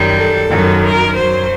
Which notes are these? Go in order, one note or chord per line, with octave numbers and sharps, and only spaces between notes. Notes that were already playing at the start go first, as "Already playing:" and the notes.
Already playing: F#2 D#3 G3
A4
F#2 D#3 F#3
A#4
F#2 F#3 C5